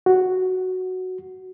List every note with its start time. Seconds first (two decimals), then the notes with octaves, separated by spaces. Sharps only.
0.06 F#4